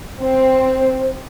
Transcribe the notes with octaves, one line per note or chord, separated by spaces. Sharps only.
C4 C5